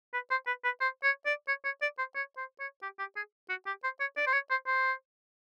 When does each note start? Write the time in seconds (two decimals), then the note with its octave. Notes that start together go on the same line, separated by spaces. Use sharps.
0.13 B4
0.31 C5
0.47 B4
0.64 B4
0.81 C5
1.04 C#5
1.26 D5
1.48 C#5
1.65 C#5
1.82 D5
1.98 C5
2.15 C#5
2.37 C5
2.60 C#5
2.82 G4
2.99 G4
3.16 G#4
3.49 F#4
3.66 G4
3.84 C5
4.00 C#5
4.17 D5
4.27 C5
4.33 C#5
4.51 C5
4.67 C5